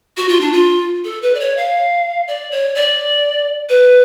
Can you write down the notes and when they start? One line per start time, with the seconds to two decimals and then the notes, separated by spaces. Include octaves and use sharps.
0.17 F#4
0.28 F4
0.41 D4
0.53 F4
1.04 A4
1.22 B4
1.35 D5
1.40 C#5
1.57 F5
2.28 D5
2.52 C#5
2.75 D5
3.69 B4